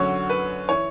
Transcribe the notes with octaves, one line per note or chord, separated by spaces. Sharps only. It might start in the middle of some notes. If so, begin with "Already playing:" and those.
Already playing: F#2 D3 F#3 C#5
B4
E3 C#5